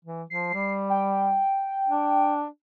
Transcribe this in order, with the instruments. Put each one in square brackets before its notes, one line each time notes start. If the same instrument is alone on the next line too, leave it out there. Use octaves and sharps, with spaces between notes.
[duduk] E3
[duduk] F3 [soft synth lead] C7
[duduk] G3
[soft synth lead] G5
[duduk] D4